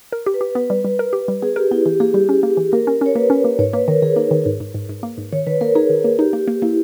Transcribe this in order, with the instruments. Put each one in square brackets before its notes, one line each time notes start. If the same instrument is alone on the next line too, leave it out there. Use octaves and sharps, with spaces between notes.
[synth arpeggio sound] A#4
G4
[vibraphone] B4
[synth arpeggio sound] G4
[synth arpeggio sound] B3 [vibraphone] B4
[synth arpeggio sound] G3
G3
A#4
G4
G3
[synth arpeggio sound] B3 [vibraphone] G#4
[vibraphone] G4 [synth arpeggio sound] A#4
[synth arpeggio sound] B3 [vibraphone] E4
[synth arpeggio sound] E3 [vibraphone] G4
[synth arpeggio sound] A#3 [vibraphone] G#4
[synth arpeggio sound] G3 [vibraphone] G4
[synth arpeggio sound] C#4
A#3
E3
[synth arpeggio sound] A#3 [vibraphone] A#4
[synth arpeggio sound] C#4
[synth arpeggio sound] C#4 [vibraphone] C#5
[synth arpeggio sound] A#3 [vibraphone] B4
[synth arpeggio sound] C#4
A#3
[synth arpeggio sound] G#2 [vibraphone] C#5
[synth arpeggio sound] A#3 [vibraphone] B4
[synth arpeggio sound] D#3 [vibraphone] A#4
[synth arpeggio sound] D#3 [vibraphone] G#4
[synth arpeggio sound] A#3 [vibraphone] D#4
[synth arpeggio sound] D#3
G#2
G#2
G#2
G#2
A#3
G#2
[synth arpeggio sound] D#3 [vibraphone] C#5
[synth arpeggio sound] D#3 [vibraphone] B4
[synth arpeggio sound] A#3 [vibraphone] A#4
[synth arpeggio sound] D#4 [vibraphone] G#4
[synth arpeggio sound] D#3
A#3
[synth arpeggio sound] D#4 [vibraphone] G4
[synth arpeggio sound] A#3
A#3
[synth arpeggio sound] A#3 [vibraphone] E4